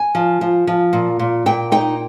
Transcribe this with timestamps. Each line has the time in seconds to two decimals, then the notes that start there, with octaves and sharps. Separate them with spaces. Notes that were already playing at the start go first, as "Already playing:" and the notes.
Already playing: G#5
0.15 F3
0.41 F3
0.67 F3
0.93 A#2
1.19 A#2
1.46 A#2 G5
1.72 D#4 G5